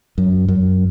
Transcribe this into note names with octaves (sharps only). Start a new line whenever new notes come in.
F#2
F#2